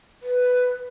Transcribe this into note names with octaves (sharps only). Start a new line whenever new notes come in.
B4